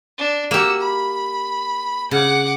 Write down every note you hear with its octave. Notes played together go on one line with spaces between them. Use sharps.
D4
A#3 F#4 G4 E6
B5
C#3 F#5 D6